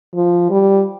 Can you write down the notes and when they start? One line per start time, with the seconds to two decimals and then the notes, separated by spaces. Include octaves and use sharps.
0.14 F3
0.50 G3